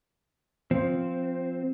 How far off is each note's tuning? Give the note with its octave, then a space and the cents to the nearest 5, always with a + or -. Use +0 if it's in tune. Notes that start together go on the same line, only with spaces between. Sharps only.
F3 +0 C4 -5